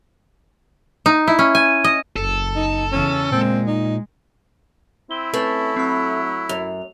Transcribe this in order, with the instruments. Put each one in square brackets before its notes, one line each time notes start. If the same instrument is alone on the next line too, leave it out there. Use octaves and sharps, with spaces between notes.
[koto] D#4
E4
C#4
G#5
D#5
[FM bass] F#1 [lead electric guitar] A4
[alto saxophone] D#4
[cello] E2 C#3 [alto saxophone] C#4
[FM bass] A#2 [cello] G#3 [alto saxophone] C4
[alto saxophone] D#4
[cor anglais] C4 [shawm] E4 [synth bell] G7
[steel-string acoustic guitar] A3 [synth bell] C4 B4 [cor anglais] C#4
[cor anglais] F#3 [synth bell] C4 B5
[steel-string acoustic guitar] F#2 [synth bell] F7